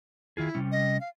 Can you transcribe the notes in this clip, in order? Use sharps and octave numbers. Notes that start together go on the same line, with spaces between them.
D#3 E4 F4 G#4
C3 G3 C#4
D#5
F5